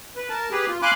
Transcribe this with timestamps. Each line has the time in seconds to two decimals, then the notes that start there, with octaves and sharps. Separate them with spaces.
0.16 B4
0.29 A#4 A5
0.51 G4 G#4 B4
0.68 F4
0.82 F5 G#5 B5 C6 D6 F#6